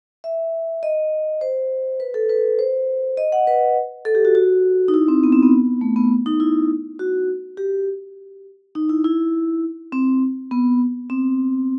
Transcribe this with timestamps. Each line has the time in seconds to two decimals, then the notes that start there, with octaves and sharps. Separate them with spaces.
0.24 E5
0.83 D#5
1.41 C5
2.00 B4
2.14 A4
2.29 B4
2.59 C5
3.17 D#5
3.32 F#5
3.47 B4
4.05 A4
4.15 G4
4.25 F#4
4.35 F#4
4.88 D#4
4.94 E4
5.08 C4
5.24 B3
5.32 C4
5.42 B3
5.81 A3
5.96 B3
6.26 D#4
6.40 E4
6.99 F#4
7.57 G4
8.75 D#4
8.89 E4
9.04 E4
9.93 C4
10.51 B3
11.10 C4